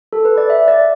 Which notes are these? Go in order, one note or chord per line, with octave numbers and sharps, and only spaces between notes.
A4
B4
D5
E5
D5